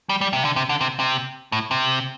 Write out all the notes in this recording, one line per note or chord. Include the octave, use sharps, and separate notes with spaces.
G3
G3
C3
D3
C3
D3
C3
C3
A2
C3